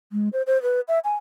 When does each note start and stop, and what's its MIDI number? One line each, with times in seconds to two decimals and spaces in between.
0.12 0.29 56
0.33 0.42 72
0.47 0.61 72
0.63 0.81 71
0.88 0.99 76
1.04 1.14 80